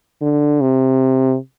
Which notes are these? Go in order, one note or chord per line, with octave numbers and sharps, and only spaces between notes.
D3
C3